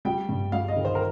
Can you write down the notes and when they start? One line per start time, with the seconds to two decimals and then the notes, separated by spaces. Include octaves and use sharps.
0.05 G3 G5
0.29 G2
0.52 G3 F5
0.68 D#5
0.76 D#3
0.85 C5
0.95 A#4